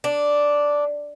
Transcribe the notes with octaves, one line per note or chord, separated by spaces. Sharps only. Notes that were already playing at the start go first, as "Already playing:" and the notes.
D4